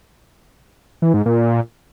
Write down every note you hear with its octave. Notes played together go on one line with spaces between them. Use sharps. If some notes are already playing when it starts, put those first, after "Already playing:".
E3
G#2
A#2